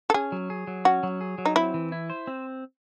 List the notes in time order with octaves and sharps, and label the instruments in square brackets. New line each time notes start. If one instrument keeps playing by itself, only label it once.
[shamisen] A4
[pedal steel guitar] C#4 [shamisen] G#4
[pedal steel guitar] F#3
G#4
F#3
[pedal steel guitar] C#4 [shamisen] F#4
[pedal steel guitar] F#3
G#4
F#3
[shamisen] D#4
[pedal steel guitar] C4 [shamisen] E4
[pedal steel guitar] E3
E4
C5
C4